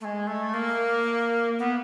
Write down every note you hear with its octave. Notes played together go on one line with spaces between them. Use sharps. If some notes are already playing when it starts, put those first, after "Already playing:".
A3
G#3
A3
A#3
B3